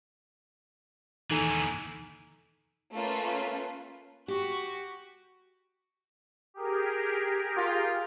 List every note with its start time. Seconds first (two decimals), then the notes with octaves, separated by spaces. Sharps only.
1.31 D#2 E3 D#4 A4 G#5
2.94 A3 A#3 C#4 F4 B4
4.28 F#4 G4
6.54 G4 G#4 A#4
7.57 F4